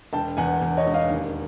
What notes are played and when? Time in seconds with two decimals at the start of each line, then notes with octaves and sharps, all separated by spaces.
0.13 E1 G5 A5
0.37 E2 F#5 G#5
0.61 E2
0.77 C#5 D#5
0.86 E1
0.94 D#5 F5
1.10 D#2